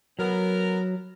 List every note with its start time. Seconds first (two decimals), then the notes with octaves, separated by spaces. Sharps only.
0.19 F#3 B3 A#4